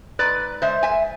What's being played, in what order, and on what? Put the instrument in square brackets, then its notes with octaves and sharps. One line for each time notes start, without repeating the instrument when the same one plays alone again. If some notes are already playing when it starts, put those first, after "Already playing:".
[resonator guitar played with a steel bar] G#2 B4 D5
G#3 C5 E5
E5 G#5